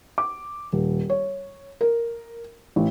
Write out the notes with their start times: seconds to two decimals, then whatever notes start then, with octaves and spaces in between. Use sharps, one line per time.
0.18 D6
0.73 D#1
1.10 C#5
1.81 A#4
2.76 A1